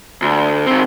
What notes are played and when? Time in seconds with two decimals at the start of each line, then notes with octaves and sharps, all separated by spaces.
0.22 D2
0.67 D#3 C4